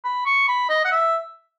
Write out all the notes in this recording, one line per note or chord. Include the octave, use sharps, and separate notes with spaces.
B5
C#6
B5
D#5
F#5
E5